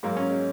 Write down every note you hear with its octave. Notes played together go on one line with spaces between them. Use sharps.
G#2 F#3 A#3
C#4
G#3